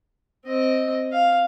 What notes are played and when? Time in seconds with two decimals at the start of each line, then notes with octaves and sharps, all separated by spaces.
0.45 C4 D#5
1.12 F5